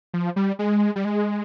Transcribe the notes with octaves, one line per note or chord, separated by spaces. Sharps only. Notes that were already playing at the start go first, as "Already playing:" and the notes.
F3
G3
G#3
G3
G#3